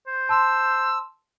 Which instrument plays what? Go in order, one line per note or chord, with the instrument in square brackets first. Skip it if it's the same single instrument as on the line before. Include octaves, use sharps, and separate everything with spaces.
[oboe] C5
[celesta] A5 C6 [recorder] E6